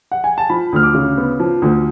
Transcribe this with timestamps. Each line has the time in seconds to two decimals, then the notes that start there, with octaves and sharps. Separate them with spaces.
0.11 F#5
0.24 G#5
0.38 A5
0.50 F3 B5
0.73 D2 F6
0.83 D6
0.94 C#3
1.17 B3
1.40 F3
1.62 D2